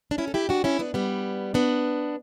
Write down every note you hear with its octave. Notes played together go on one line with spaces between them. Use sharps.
D4
C#4 E4
A4
E4 G4
D4 F#4
C#4 E4
B3 D4
G3 B3
B3 D4